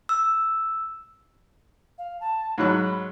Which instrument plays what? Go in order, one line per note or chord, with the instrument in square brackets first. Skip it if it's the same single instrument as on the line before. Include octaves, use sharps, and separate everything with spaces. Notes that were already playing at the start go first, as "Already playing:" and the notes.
[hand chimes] E6
[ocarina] F5
A5
[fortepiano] G#2 F#3 F#6 [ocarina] B5